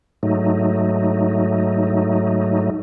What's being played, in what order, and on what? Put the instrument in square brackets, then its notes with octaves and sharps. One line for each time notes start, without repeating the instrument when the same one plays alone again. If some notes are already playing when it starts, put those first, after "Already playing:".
[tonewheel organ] G#2 F#3 A3 D#4